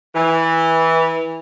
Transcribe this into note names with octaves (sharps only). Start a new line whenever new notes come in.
E3